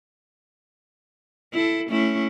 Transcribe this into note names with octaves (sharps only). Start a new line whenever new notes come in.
E4 A4
A3 C#4 E4